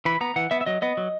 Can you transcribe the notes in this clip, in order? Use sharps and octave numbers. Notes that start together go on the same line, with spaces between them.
E3 B5
B3 A#5
E3 F#5
B3 E5
E5
F#3 D#5
B3 D#5
F#3